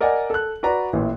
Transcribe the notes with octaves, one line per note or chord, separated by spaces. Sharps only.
A#4 D5 D#5 F#5 G#5
A4 F#6
F#4 B4 D5 A#5 B5
A1 A#2 E3